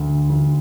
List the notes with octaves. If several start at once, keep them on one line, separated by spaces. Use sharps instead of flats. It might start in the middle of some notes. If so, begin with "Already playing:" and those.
Already playing: D2
D2